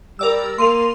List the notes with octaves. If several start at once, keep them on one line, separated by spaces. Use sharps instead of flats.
G3 A#4 D5 E6
A#3 C6 D#7 F7